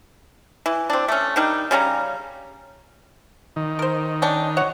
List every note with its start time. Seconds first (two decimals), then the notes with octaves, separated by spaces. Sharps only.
0.66 E3
0.90 C4 D4
1.08 A3 C#4
1.36 D#3 G3 D4 D#4
1.71 C#3 G3 C#4 A#5
3.56 D#3
3.79 A#4 C5
4.22 C#4 D4 G5
4.57 F#4 C#5 F#5